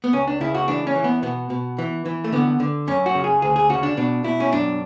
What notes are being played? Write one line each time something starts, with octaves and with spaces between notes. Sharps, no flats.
B3
C#2 C#4
D4
C#3 E4
F#4
E3 D4
C#4
E3
B3
B2 B3
B2
E3
E3
A3
D3 B3
D3
F#2 C#4
F#4
C#3
G#4
D2 G#4
G#4
C#3 F#4
D4
B2 D4
B2 E4
C#4
F#2 D4